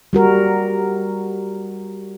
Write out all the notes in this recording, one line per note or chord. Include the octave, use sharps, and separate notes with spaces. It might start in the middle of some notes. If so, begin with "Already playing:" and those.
G3 F#4 A#4